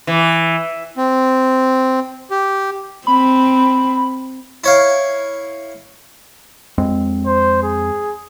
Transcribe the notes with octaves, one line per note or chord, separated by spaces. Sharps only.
E3
C4
G4
C4 B5
E4 C#5 F5
F2 G#3 C4
C5
G#4